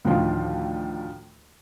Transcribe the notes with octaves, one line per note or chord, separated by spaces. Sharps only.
D2 A2 D3 D#3 F3 C6